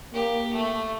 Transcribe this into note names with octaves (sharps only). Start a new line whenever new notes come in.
A#3 G4
A3